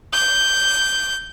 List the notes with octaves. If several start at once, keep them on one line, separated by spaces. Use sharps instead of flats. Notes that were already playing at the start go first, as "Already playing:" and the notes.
G6